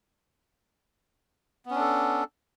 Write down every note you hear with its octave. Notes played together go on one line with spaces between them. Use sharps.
B3 C#4 D4 A4